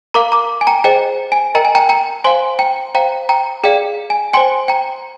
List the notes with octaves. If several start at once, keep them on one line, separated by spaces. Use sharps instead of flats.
A#4 F5 A#5 D6
A#5 D6
G#5
G5 A#5
G#4 C5 D#5 G5
G#5
A#4 D#5 G5 A#5
G#5
G5 A#5
G5 A#5
C5 F5 G#5 C6
G5 A#5
C5 F5 G5 A#5
G5 A#5
G#4 D5 F5 G5
G#5
C5 G5 G#5 C6
G5 A#5